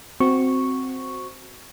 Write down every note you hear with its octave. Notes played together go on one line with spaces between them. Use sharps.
C4 F#4 C#6